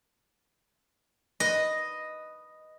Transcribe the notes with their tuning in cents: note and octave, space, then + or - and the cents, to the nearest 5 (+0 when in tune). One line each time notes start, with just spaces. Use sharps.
B4 +0 D#5 +0